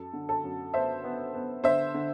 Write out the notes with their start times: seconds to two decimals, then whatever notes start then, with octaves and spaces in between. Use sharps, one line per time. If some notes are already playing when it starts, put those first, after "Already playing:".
Already playing: F#2 A4
0.13 D3
0.29 A4
0.44 F#2
0.74 B3 C5 E5
1.04 B3
1.34 B3
1.64 D3 C5 E5
1.94 D3